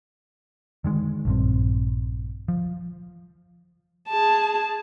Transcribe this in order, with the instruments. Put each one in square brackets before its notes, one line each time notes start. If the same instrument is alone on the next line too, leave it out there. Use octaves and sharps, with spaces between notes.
[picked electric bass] D3 D#3 G#3
A#1 G2 C4
F3
[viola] G#4 A5